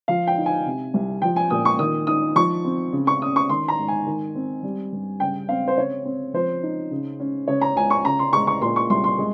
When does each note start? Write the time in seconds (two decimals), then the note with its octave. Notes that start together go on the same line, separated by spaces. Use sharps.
0.08 F3 F5
0.27 G5
0.38 D#4
0.46 G#5
0.66 C3
0.94 C2
1.22 F3 G5
1.36 G#5
1.50 A#2 D#6
1.65 C#6
1.79 D#3 D#6
2.07 D#4 D#6
2.35 F3 C#6
2.64 C4
2.92 C#3
3.07 C#6
3.21 C#4 D#6
3.36 C#6
3.49 D#3 C6
3.68 A#5
3.79 G#2
3.88 G#5
4.06 D#3
4.35 C4
4.63 G3
4.93 G2
5.20 C#3 G5
5.49 C4 F5
5.68 C5
5.77 C#3 C#5
6.05 C4
6.33 F3 C5
6.63 D#4
6.91 C#3
7.20 C#4
7.48 C#3 C#5
7.61 A#5
7.76 C#2 G#5
7.90 C#6
8.05 C#3 A#5
8.19 C6
8.33 G#3 C#6
8.47 C#6
8.61 A#2 C6
8.76 C#6
8.90 C2 C6
9.04 C6
9.18 G#3